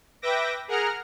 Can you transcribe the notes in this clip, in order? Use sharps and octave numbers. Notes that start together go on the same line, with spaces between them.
B4 E5 G5 D6 A#6
G#4 A#4 F#5 A#5 F6